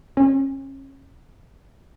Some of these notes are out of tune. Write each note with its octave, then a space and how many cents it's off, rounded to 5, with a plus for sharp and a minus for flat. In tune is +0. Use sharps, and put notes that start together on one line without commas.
C#4 -30